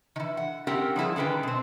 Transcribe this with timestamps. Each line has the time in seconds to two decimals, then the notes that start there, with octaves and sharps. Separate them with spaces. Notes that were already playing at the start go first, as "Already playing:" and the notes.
0.16 D#3 E3
0.37 F#5
0.67 C4 C#4 G4 A#4 F#5
0.96 F3 G3 E4 G#4
1.16 D3 D#3 C#4 B4 G5
1.43 B2 C4